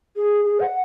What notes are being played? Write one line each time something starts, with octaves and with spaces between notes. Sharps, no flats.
G#4
G#4
F#5